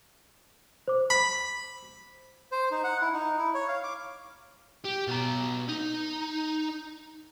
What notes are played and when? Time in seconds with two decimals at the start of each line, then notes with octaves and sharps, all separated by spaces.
0.88 C5 D6
1.10 B5
2.52 C5
2.71 D#4
2.84 F#5
3.01 E4
3.13 D#4
3.38 E4
3.54 C#5
3.68 F5
3.84 D6
4.85 G4
5.08 B2 A#5
5.69 D#4